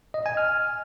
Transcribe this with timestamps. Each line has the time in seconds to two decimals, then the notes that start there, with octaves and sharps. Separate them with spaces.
0.14 D#5
0.26 G#5
0.37 F6